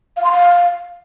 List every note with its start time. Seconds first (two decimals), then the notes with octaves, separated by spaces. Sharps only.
0.17 F5
0.24 C6
0.32 F5